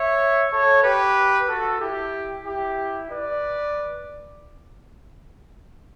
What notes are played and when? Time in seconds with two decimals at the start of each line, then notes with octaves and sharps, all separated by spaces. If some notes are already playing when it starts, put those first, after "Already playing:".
Already playing: C#5 E5
0.51 A4 C#5
0.83 G4 B4
1.48 F#4 A4
1.80 E4 G4
2.45 E4 G4
3.10 B4 D5